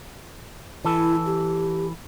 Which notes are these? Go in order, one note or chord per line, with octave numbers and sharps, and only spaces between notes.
E3 E4 A4
G4